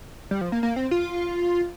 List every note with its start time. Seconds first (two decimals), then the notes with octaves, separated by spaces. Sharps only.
0.31 G3
0.41 F3
0.52 A#3
0.63 A#3
0.76 C4
0.91 F4